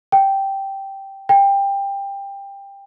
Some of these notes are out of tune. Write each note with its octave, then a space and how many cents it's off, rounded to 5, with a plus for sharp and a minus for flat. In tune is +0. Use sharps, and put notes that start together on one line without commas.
G5 -5
G5 +20